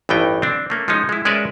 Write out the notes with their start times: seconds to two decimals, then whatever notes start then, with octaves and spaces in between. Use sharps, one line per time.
0.09 A1 G2 E3 B3 D#4 G5
0.42 C4 D4
0.70 A3 A#3 C#4
0.88 F3 G#3 C#4 D#4
1.09 G#3 E4
1.25 G#3 C#4 A#4 B4 D5 E5